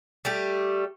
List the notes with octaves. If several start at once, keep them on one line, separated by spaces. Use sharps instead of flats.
G3 A3 G4